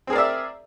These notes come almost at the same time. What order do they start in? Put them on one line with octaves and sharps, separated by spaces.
C4 G#4 A#4 D5 E5